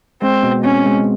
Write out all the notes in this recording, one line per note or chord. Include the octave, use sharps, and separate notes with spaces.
G#3 C4
B2
C4 C#4
G#3